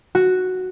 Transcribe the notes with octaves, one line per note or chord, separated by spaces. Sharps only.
F#4